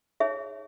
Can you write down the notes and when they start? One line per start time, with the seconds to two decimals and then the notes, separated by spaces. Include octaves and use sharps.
0.20 D#4 G#4 C#5 E5